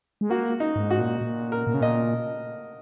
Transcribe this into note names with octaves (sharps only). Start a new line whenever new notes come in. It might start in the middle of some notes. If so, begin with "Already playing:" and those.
G#3
A#3 F#4
D#4
G#2
F#4
A#2
A#2
A#4
A#2
C#3
A#2 D#5